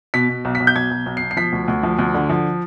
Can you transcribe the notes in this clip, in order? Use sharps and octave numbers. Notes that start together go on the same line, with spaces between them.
B2 B6
B2
B1
B6
B1
G6
B1 G#6
B1
B1
B2 C7
C7
F3 B6
D2
D2
F3
D2
D3
F3